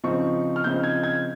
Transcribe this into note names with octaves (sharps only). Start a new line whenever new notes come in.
C#3 F3 C4 D#4 C#6
F6
C#3 F3 C4 D#4 G6
G#6
G#6